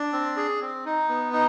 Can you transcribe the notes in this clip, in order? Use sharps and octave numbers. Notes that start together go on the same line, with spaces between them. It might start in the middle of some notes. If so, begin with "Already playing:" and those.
Already playing: D4
C4
G#4
C4
D#4
B3
D#4